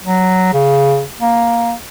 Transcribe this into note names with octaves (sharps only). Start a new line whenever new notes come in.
F#3
C#3
A#3